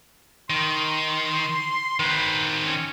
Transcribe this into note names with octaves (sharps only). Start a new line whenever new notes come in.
D#3 C6
D#3 B4 C5
C#4